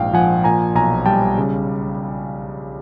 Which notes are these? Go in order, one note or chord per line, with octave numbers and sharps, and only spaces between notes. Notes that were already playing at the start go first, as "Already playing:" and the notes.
Already playing: A#1 G#2 F5 G5
F3 F#5 G#5
A#2 G#5 A#5
B1 G#5 A#5
G3 G5 A5
C#3